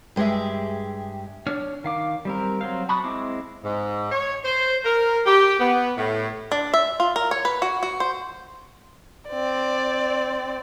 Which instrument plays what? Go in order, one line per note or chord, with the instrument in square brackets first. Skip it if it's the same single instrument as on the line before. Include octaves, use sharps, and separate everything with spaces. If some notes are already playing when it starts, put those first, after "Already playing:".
[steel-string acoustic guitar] G2 G#3 G4 G#4 E5
[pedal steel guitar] D4 C#5 F6
D#3 F5 D6
G3 C4 A#4
F#3 C4 F5
A5 B5 C#6 D#6 F#6
G#3 C4 E4 D6
[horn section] G#2
C#5
C5
A#4
G4
B3
A2
[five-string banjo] D4
E5
F4
A#4
C#5
B4
F#4
F#4
C5
[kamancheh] C4 D5